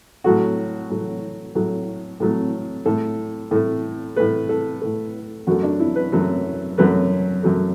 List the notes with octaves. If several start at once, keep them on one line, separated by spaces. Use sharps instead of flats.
A2 F#3 A3 F#4
A2 F#3 A3
A2 F#3 A3
A2 F#3 A3
A2 A3 A4
A2 A3
A2 A3 B4
A4
A2 A3 A4
F#2 F#3 A3 F#4
D4
E4
B4
F#2 F#3 A3 A4
F#2 F#3 A3 B4
F#2 F#3 A3